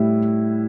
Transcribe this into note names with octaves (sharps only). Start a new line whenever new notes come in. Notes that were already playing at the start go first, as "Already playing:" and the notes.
Already playing: A2 G3 E4